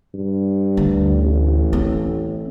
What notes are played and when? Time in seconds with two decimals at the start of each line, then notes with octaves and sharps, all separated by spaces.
0.14 G2
0.77 D2
1.17 A1
1.73 C4